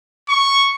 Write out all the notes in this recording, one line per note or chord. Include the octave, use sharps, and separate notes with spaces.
C#6